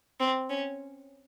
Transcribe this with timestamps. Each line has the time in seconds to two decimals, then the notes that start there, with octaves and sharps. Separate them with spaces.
0.20 C4
0.50 C#4